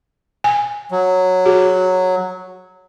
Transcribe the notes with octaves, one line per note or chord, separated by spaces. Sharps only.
G#5
F#3
F#4 G#4